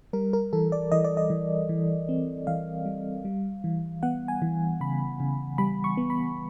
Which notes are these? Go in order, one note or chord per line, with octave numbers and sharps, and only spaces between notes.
G3 A#4
A#4
E3 A4
D5
E3 D#5
D5
D#5
E3
E3
C4
E3 F5
G3
G3
E3
B3 F#5
G#5
E3
C#3 B5
C#3
G3 B5
C#6
B3
B5